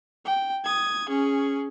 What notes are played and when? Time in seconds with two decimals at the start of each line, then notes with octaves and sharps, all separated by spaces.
0.25 G5
0.65 D#6 G#6
1.09 C#4 G#4